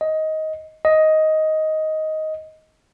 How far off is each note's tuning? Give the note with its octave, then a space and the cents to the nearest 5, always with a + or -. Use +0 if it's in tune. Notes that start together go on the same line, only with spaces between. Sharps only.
D#5 +15
D#5 +10